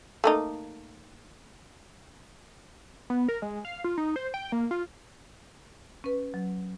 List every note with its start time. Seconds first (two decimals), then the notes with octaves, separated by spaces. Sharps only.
0.24 A3 A#3 D#4
3.10 B3
3.29 A#4
3.42 G#3
3.65 F5
3.84 F4
3.98 D#4
4.16 C5
4.34 G5
4.52 A#3
4.71 F4
6.04 C#4 B4
6.34 F#3